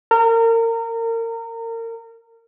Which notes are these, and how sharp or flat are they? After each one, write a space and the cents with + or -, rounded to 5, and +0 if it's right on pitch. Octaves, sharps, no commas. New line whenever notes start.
A#4 -30